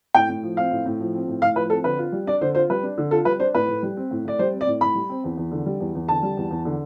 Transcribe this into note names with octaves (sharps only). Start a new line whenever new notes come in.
A2 G5
A2
F3
C4 F5
A2
A2
F3
C4
A2
A2 F5
F3 B4
C4 A4
D3 B4
F4
G3
D4 D5
D3 C5
F4 C5
G3 B4
D4
D3
F4 A4
G3 B4
D4 C5
A2 B4
A2
G3
C4
A2
A2 D5
G3 C5
C4
D5
A2
A2 B5
G3
C4
E2
E2
D3
G3
E2
E2
D3 A5
G3
E2
E2
D3